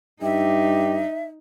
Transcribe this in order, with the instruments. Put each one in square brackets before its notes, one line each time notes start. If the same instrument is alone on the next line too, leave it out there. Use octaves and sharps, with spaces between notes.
[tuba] G2 [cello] D#4 [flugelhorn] G4 [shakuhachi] E5